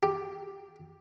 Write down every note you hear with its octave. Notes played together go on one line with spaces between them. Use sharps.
G4